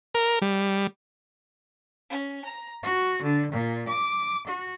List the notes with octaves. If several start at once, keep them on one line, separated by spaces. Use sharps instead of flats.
A#4
G3
C#4
A#5
F#4
D3
A#2
D6
F#4